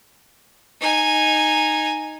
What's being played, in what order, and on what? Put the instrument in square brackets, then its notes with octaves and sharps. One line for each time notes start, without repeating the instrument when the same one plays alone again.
[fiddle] D#4 G#5